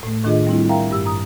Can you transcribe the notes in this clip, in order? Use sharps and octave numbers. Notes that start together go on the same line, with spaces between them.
A2 A3
A2 D#3 D4 F4 G#4 D#5
G3 C4 E4
A#4 E5 F5 G5 A#5
G2 G4 E6
A#5 D#6